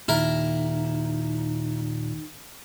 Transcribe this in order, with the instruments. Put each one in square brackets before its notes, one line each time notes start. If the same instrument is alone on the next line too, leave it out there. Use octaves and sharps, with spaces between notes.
[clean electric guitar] D#2 [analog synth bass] A#2 [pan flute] D#4 [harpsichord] E4 A#4